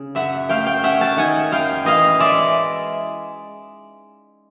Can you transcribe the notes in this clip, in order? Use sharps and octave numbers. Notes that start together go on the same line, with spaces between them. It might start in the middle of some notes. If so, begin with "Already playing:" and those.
Already playing: C#3
F#2 E5 F#5
A3 F5 G5
F5 G5
C#4 E5 F#5
G5 A5
D#3 F#5 G#5
F#2 F5 G5
E3 D#5 F5
G#3 D5 E5